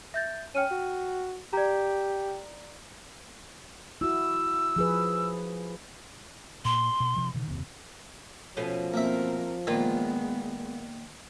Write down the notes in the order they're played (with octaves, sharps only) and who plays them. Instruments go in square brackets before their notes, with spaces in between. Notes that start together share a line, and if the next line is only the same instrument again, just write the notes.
[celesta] E5 G6 A6
[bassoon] C#4 [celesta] G5 F6 D#7
[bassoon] F#4
[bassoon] G4 [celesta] D5 A#5
[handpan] E4 F#4 [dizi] E6
[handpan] F3 G#4 B4
[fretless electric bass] A#2 [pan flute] C6
[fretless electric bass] B2
C3 F3
B2 D3 D#3
F#1 D#2 C3
[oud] B2 A3 C#4 [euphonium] F3
[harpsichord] A#3 E5 [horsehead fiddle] C4 A#4
[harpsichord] A#2 D#3 [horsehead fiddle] G#3 B3 [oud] A#3 F4